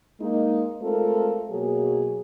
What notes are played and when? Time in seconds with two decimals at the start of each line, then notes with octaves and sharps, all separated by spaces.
0.21 G#3 A#3 D#4
0.82 G#3 A3 C4 F4 A4 A#4
1.50 B2 F#3 A#3 G#4